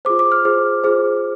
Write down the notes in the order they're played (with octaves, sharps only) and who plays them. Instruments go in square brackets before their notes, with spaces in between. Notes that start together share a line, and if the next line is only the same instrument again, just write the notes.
[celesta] F4 G#4 C5 D6
D6
F6
F4 G#4 C5
F4 G#4 C5